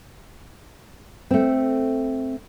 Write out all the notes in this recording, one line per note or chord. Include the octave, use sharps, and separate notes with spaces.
A3 C4